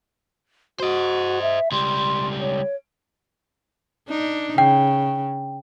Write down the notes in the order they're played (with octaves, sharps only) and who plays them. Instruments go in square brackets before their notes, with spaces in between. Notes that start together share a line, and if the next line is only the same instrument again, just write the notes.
[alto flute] F#4 [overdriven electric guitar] C5 D#5
[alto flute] E5
[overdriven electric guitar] C#2 G3 [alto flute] C6
[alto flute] C#5
[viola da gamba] D4 D#4
[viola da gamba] C#3 [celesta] G5